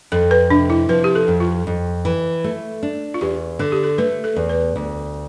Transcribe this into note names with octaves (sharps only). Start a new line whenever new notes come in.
F2 A4
B4
C3 D4
E4
F3 B4
G4
A4
F2
F4
F2
E3
A3
D4
F4
E2 G4
D3 A4
G4
A4
A3 B4
A4
E2
B4
D2